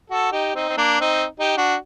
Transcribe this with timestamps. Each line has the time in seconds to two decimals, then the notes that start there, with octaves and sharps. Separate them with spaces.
0.10 F#4 A4
0.32 D#4 G4
0.55 C4 D#4
0.69 C4
0.78 A#3 D4
1.01 C4 D#4
1.40 D#4 G4
1.57 D4 F#4